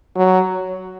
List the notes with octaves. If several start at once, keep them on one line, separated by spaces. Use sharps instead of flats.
F#3